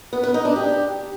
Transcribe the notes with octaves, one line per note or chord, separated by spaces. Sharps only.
B3
B4
D#4
D4
G4